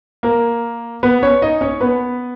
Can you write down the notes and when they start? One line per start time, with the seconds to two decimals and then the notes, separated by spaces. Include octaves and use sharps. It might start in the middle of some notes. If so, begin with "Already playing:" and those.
0.23 A#3 A#4
1.03 B3 B4
1.23 C#4 C#5
1.42 D#4 D#5
1.61 C#4 C#5
1.81 B3 B4